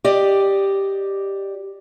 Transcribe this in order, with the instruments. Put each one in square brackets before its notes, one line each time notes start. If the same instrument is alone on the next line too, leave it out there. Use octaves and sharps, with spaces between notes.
[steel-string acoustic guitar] G4 D5 D#5